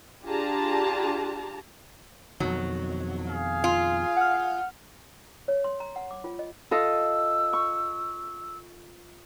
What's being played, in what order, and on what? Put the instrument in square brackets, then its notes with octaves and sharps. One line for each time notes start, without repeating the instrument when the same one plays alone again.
[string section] D4 F4 G4 G#4 A5 A#5
[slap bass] F2 B2 D#3 [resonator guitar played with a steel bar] F#3
[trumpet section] G#4 F5
[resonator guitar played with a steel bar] F4
[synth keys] F#5 F6
[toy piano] C#5
C6
A#5
F#5
D6
F4
D#5
[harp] F4 A4 D#5 [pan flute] E6
[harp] C#6